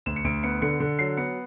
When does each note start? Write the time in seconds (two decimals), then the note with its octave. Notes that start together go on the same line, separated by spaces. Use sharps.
0.06 D2 E7
0.16 C#7
0.24 D2 D7
0.43 B3 C#7
0.62 D3 C#7
0.80 D3 C#7
0.99 F#3 C7
1.17 B3 C#7